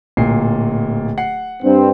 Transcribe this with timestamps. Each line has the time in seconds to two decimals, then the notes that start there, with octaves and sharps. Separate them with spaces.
0.17 D1 A#2 C7
1.18 F#5 C7
1.62 G2 C4